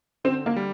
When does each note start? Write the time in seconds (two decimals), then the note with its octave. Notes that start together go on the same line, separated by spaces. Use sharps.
0.24 D3 C4
0.46 A#3
0.56 G3